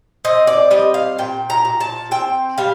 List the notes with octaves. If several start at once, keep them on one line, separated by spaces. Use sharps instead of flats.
C4 D#5
D5
G3 D#5
F5
A#2 G5
A#5
A#2
A5
C4 G5
G3 F5